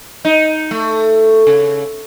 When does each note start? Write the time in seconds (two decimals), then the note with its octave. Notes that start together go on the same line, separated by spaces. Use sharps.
0.25 D#4
0.71 A3
1.47 C#3